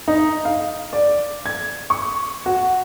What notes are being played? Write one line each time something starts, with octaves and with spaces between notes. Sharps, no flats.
D#4
F5
D5
G#6
C#6
F#4